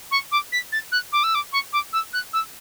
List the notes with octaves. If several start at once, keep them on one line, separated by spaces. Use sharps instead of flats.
C#6
D6
B6
A6
F#6
D6
E6
D6
C#6
D6
E6
F#6
E6